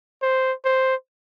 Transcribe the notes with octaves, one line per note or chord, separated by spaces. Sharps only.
C5
C5